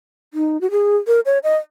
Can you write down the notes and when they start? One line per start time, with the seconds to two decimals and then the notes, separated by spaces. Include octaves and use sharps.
0.34 D#4
0.61 F#4
0.71 G#4
1.07 A#4
1.26 C#5
1.44 D#5